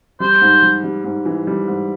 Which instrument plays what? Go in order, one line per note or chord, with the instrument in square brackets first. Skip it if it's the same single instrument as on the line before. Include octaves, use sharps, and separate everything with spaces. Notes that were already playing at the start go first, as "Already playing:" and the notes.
[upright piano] G3 [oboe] C5
[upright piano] G#2
G3
G3
G#2
E3
G3
G#2